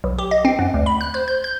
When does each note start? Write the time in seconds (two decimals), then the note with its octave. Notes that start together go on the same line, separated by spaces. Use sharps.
0.04 B1
0.18 G4
0.31 D#5
0.45 C4
0.59 F#2
0.74 D2
0.86 B5
1.01 F#6
1.14 C5
1.28 G6
1.44 G6